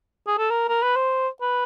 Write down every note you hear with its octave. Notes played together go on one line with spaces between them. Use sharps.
G#4
A4
A#4
A#4
B4
C5
B4